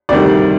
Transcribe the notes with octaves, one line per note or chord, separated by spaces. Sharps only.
D2 C3 D#3 G3 D5